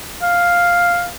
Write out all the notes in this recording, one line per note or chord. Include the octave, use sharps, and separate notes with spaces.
F5